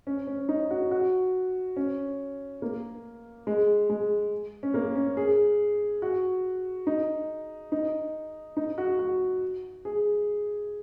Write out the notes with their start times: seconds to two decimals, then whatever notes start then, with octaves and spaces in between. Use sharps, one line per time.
0.07 C#4
0.27 C#4
0.49 D#4
0.71 F#4
0.91 F#4
1.76 C#4
2.62 A#3
3.47 G#3
3.90 G#3
4.63 C#4
4.74 A#3
4.96 C#4
5.17 G#4
6.02 F#4
6.87 D#4
7.72 D#4
8.57 D#4
8.78 F#4
8.99 F#4
9.85 G#4